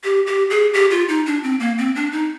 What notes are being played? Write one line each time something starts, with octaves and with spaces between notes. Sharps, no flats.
G4
G4
G#4
G4
F4
D#4
D4
C4
A#3
C4
D4
D#4